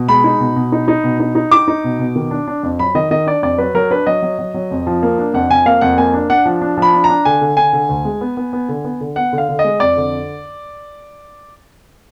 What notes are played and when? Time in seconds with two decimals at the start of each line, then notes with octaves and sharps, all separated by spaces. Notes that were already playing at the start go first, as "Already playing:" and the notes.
Already playing: B2
0.08 G#3 B5
0.24 D#4
0.40 B2
0.56 B2
0.72 D#4
0.88 D#4
1.04 B2
1.20 D#4
1.35 D#4
1.51 D#4 D6
1.68 D#4
1.84 B2
1.99 B2
2.16 D#3
2.31 D4
2.48 D4
2.63 F2
2.79 F#3 B5
2.95 D#3 D#5
3.11 D#3 D#5
3.26 D4 D5
3.43 F2 D5
3.58 F#3 B4
3.75 F#3 A#4
3.90 D4 B4
4.07 F#3 D#5
4.22 F#3
4.39 F#3
4.54 F#3
4.71 F2
4.87 F3
5.03 A#3
5.18 D4
5.34 F2 F#5
5.50 F2 G#5
5.66 A#3 F5
5.81 F2 F#5
5.98 A#3 G#5
6.14 D4
6.30 D4 F#5
6.45 F3
6.61 D4
6.77 F3 B5
6.93 D4
7.04 A#5
7.09 D4
7.25 D3 G#5
7.41 D3
7.57 D3 G#5
7.73 D3
7.89 D2
8.05 G#3
8.21 B3
8.37 B3
8.53 B3
8.69 D3
8.84 B3
9.01 D3
9.16 B3 F#5
9.33 D3
9.38 F5
9.49 D3
9.59 D#5
9.64 G#3
9.80 F2 D5
9.97 D3